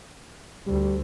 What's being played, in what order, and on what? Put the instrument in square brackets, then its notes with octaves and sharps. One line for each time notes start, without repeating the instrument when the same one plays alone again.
[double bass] D2 [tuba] G3